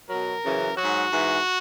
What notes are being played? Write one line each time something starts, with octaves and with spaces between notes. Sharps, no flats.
B2 F#3 A#4
F#2 C#3 E3
G#2 F#3 F#4
G#2 E3